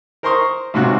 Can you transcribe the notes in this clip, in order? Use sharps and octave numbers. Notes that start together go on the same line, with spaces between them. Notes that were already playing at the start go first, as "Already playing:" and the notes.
A#4 C5 A#5 C6 C#6 D#6
C#2 G#2 C3 F#4 F#6